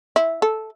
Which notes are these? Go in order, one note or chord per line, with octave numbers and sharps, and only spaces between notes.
E4
A4